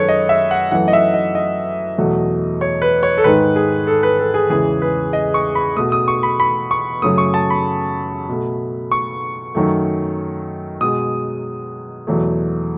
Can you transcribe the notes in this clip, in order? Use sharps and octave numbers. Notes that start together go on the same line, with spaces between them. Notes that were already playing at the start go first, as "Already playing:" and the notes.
Already playing: F#2 D#3 G#3 A4 B4 C#5
D#5
E5
F#5
F#2 E3 A3 F#5
D#5
E5
D#5
D#5
E2 B2 F#3 A3
C#5
B4
C#5
A4
G#2 D#3 G#3 B4
G#4
A4
B4
A4
G#4
E2 C#3 E3 G#3 G#4
B4
D#5
C#6
B5
B2 A3 D#6
D#6
C#6
B5
B5
C#6
F#2 C#3 F#3 A3 D#6
C#6
A5
B5
B2 A3
C#6
F#2 D#3 F#3 A3
B2 G#3 D#6
E2 B2 F#3 A3